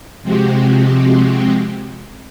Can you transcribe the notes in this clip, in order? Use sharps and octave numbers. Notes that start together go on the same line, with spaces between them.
C3 F3 G#3 C4 F#4 G4